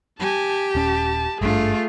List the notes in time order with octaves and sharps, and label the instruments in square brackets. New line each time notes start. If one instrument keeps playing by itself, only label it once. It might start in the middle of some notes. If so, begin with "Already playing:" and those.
[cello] G4 [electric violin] G#5 A5
[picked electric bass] D#1 C#4 [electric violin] A5
[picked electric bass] G#1 G2 D4 [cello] A3 F4 [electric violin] G#4